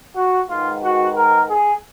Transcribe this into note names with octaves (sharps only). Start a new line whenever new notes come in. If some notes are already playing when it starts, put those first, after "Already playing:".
F#4
G#2 D#3 G#3 B3 F4
F#4
A#4
G#4